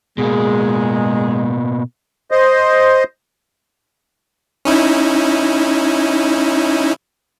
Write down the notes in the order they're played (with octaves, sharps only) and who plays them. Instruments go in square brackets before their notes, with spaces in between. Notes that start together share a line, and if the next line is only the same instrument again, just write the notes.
[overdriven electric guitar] B2 A#3 [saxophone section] G#3
[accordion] C5 D#5
[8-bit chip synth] C#4 D#4 E4